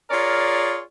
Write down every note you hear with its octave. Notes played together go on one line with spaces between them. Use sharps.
F4 G#4 A#4 C#5 D5